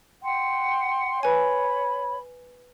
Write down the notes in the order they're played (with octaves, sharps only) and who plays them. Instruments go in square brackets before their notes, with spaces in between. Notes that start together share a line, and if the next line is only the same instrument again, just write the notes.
[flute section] F#5 G5 C6
[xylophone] B4 G#5 [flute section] C#5 B5